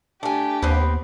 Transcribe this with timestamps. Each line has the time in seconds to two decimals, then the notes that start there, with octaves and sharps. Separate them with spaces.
0.23 A3 D4 G4 G#5
0.63 D#2 B3 C4